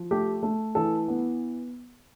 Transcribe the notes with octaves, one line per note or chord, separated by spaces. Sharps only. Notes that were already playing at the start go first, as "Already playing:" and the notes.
Already playing: F3
A3 G4
A3
E3 A4
B3